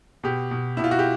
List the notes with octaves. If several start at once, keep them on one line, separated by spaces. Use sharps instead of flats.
B2 G4
B2
B2 E4
F4
F#4
G4